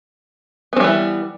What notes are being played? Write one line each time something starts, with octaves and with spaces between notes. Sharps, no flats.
E3 G3 B3 C4